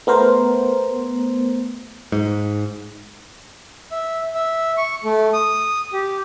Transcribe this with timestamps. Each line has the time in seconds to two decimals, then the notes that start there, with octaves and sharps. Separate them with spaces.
0.07 A3 B3 A#4 C5
2.12 G#2
3.91 E5
4.34 E5
4.78 C#6
5.04 A3
5.33 D#6
5.93 G4